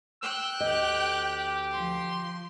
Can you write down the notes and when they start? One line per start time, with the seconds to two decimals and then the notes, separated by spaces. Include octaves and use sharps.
0.22 G5 E6 F#6 G6
0.60 D2 G4 D#5
1.72 F3 C6